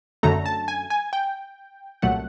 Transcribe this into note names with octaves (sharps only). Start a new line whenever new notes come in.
F#2 D3 F#3 A3 A#5
A5
G#5
G#5
G5
C2 A#2 F#3 A3 F#5